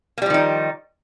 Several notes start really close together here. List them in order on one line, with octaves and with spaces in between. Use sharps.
A#3 G3 F3 D#3 D#4